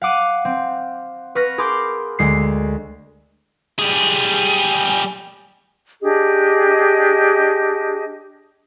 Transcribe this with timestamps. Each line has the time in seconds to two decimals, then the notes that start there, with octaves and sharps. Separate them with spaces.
0.02 F5 F#5 D6 D#7
0.45 C4
1.35 B4 C#6 F6 A#6
1.58 G#4 A#4 B5 C6 D6 G6
2.19 D2 G#3 C7
3.79 G3 G#4
6.01 D4 G4 G#4 D#5